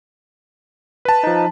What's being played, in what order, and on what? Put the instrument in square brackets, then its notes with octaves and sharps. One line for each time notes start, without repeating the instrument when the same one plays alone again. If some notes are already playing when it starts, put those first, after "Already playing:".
[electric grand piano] B4 A5
[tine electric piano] F3 D#4